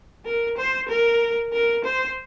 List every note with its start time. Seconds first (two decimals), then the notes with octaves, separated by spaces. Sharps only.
0.25 A#4
0.57 C5
0.89 A#4
1.53 A#4
1.85 C5